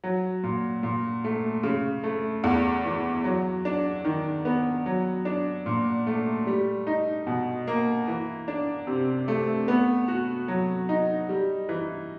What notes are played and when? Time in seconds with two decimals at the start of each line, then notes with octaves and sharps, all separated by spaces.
0.04 F#3
0.43 A#2
0.83 A#2
1.24 A3
1.63 C#3
2.04 A3
2.44 E2
2.85 E3
3.24 F#3
3.65 D4
4.05 D#3
4.45 B3
4.86 F#3
5.25 D4
5.66 A#2
6.07 A3
6.47 G3
6.87 D#4
7.27 B2
7.67 A#3
8.08 E3
8.48 D4
8.87 C3
9.28 A3
9.68 B3
10.08 F#4
10.48 F#3
10.89 D#4
11.29 G3
11.69 E3